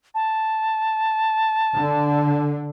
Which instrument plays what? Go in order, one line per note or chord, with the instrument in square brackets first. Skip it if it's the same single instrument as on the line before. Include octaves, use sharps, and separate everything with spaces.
[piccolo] A5
[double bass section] D3